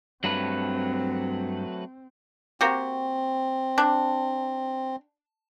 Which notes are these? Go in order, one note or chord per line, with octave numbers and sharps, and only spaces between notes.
G2 F#3 A3 C4 B4
A#3 C4 F#4 G4
D4